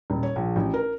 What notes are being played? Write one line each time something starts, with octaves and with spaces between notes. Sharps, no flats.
D#1
C#5
A#1
A1
A#4